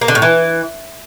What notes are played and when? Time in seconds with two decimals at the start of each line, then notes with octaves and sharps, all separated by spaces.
0.01 A#3
0.08 D3
0.15 A2
0.22 E3